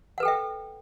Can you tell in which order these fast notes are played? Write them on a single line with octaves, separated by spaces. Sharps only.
F#5 B4 A4 G5 E5